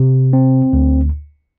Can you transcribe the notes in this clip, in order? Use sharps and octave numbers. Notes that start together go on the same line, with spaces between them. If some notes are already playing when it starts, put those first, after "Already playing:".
Already playing: C3
C4
D2